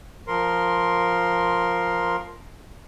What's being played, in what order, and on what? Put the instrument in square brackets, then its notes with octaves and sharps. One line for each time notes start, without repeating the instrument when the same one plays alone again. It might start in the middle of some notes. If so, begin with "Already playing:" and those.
[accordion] F3 A#4 C6